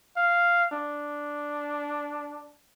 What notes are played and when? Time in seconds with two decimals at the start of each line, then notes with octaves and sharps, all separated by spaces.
0.16 F5
0.72 D4